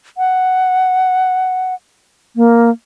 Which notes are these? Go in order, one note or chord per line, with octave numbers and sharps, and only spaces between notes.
F#5
A#3